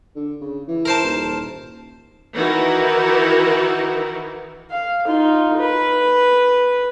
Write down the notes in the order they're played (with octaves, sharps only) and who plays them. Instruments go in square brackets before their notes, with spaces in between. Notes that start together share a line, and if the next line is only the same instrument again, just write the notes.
[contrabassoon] D3
C#3
E3
[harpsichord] A#4 C5 A5
[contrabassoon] D#1
[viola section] D#3 E3 D#4 E4 F#4 A#4
[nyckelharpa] F5
D#4 F4
B4